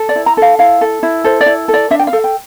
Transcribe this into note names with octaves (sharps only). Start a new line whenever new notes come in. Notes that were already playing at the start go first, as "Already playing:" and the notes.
Already playing: A4
D5
E4
A#5
A4 F5
E4 F5
A4
E4
A4 C5
D5
E4
A4
D5
D4 E5
G5
F5
A4
G5